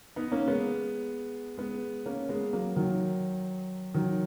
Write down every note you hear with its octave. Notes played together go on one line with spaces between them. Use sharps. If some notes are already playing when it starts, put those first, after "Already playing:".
B3 D#4
A#3 C#4
G#3 B3
G#3 B3
A#3 C#4
G#3 B3
F#3 A#3
D#3 F#3
D#3 F#3